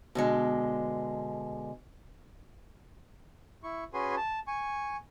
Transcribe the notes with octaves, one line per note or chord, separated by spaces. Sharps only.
B2 D3 G#3
E4 C#6
C#4 F#4 G#4 B4 G#5 C6
A5
G#5 C#6